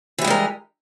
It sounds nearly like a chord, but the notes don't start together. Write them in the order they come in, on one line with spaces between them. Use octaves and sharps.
E3 G4 G#3 G3 A#4